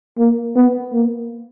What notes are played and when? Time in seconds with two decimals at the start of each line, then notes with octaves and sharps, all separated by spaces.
0.18 A#3
0.55 B3
0.93 A#3